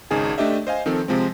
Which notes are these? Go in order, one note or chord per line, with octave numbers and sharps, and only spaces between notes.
G#1 C#3 D#4 G#4 G#5
A3 D4 G4 D#5 E5
C5 D#5 F5 G#5
D#3 F3 C4 A4
C3 F3 G#3 C4